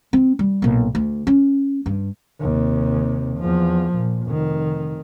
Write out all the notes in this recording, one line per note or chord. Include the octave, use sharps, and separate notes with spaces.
C4
G3
B1 A#2
D2
C#4
G2
D#2 C3
E2 F3
A#2
F1 D#3